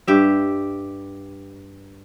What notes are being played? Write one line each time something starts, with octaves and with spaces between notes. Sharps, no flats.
G2 G4 E5